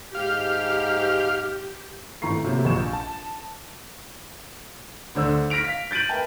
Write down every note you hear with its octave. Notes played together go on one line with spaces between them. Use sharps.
G#2 G4 F5
G#1 A2 E3 A#5 C#6 C7
C3 F#3 A3 A#3 C4 A#4
A#1 C#6 E7
A5
D2 D3 C5 E6
F6 A#6 B6 D7 F7
F5 B6
G6 A6 D7 D#7 F#7
A#4 B4 E5 G5 A5